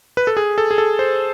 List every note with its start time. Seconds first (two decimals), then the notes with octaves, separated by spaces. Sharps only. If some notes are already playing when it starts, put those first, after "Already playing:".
0.17 B4
0.27 A4
0.37 G#4
0.58 A4
0.71 G#4
0.78 A4
0.99 C5